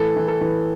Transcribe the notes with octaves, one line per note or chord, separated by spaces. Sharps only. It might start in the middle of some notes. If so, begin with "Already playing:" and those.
Already playing: A2 E3 A4
E3
A4
E3